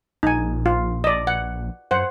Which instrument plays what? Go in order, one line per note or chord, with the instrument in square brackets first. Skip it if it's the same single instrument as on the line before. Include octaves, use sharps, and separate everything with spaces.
[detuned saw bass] A#1 [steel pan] D#4 G#5
[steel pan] F4
D5 D#5
F#5
[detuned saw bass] F#2 [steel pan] C5 F#5